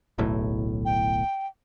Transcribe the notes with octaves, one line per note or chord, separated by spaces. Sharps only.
D1 B1 A2
G5